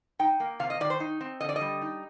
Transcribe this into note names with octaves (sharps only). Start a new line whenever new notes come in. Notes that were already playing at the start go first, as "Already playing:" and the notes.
D#4 G5
A#3
C3 F5
D#5
D#3 D5
C5
D#4
C4
D3 D#5
D5
D#5
G3
D#4